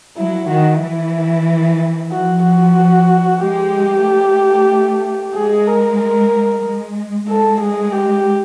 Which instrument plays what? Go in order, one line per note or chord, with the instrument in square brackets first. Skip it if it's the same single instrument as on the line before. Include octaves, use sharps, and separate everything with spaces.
[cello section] F#3 [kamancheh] E4
[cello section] D#3 [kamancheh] F#4
[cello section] E3 [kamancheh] E4
[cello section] F3 [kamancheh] F#4
[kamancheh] F#4
[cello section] G#3 [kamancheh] G4
[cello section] A3
[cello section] G#3 [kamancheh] G#4
[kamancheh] A#4
A#4
[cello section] G#3
[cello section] G#3 [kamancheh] A4
[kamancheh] G#4
G4